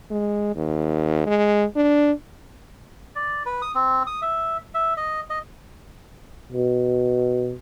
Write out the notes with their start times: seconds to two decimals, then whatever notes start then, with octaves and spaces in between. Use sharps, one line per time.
0.11 G#3
0.56 D#2
1.27 G#3
1.76 D4
3.15 D5
3.46 B4
3.62 D#6
3.75 C4
4.07 D#6
4.22 E5
4.74 E5
4.97 D#5
5.30 D#5
6.52 B2